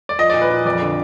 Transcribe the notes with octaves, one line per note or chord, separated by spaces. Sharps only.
D5
F3 D#5
A#2 D5
B4
A#2
F2 D5
D3